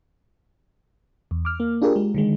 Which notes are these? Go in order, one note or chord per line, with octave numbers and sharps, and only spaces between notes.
E2
D6 F6
A#3
D4 F4 G4 G#4 A#4
G#3
D3 D#3 G#3